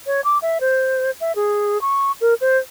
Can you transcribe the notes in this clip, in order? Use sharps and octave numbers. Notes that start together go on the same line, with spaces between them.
C#5
D6
E5
C5
E5
G#4
C#6
A#4
C5